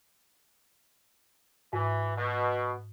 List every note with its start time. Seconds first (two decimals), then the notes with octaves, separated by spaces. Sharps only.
1.73 G#2 E3
2.16 B2